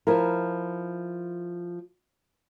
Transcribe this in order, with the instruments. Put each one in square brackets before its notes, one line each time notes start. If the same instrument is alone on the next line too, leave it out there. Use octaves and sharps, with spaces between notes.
[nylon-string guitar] F3 E4 A#4